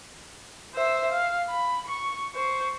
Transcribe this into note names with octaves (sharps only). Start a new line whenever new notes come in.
C5 E5
F5
B5
C#6
C5 C#6